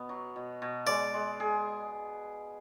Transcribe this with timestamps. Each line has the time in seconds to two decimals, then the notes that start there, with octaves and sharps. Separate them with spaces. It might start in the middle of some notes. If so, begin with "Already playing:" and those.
Already playing: B2 B3
0.09 F#3
0.36 B2
0.62 B2
0.87 G#3 D5
1.14 G#3
1.40 G#4